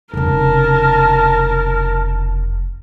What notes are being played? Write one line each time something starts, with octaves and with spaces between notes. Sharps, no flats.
F1 C#3 A#4 A5